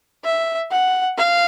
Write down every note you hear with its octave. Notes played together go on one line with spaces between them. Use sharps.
E5
F#5
F5